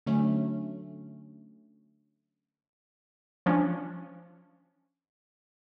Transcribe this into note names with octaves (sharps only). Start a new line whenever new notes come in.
D3 F#3 A3 C#4
F3 C#4 D4